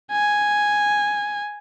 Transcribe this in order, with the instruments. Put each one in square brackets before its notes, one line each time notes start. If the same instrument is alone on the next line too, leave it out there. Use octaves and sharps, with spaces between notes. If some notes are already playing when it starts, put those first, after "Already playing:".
[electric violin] G#5